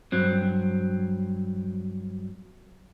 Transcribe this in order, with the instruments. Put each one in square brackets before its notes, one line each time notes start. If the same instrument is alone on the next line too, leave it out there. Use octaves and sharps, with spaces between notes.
[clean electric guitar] G2 F#3 C4